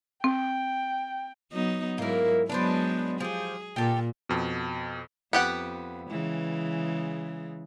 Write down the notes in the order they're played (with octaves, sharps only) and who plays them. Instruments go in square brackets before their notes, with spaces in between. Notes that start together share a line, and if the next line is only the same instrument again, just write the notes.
[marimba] C4 [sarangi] G5
[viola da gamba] F#3 B3 D#4
[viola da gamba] G#2 F#3 E4 [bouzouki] A#3 A#4
[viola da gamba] F#3 G#3 B3 [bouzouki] D4 B4 C5
[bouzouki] F3 G4 [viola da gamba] G#4
[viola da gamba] A#2 [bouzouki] G4 A4
[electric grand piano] F2 B2
[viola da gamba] F2 [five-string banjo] B3 G4 F#5
[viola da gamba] C#3 E3 G#3